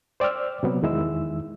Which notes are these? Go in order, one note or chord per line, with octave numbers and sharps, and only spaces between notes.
C5 D5 G5 E6 F6
C3 F#3 B3
E2 D#3 G#3 E4 E6